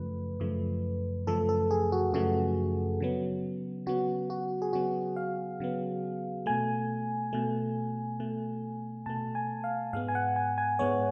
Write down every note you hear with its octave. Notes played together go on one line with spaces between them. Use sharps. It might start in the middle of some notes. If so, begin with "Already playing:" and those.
Already playing: F#2 C#3 F3 A3 B4
F#2 C#3 F3 A3
F#2 C#3 F3 A3 A4
A4
G#4
F#4
F#2 C#3 F3 A3 F#4
C#3 F#3 B3
C#3 F#3 B3 F#4
F#4
G#4
C#3 F#3 B3 F#4
F5
C#3 F#3 B3
B2 A3 G#5
B2 A3
B2 A3
B2 A3 A5
G#5
F5
G#2 G#3 B3 F5
G#5
F#5
G#5
G#5
G#2 G#3 B3 C#5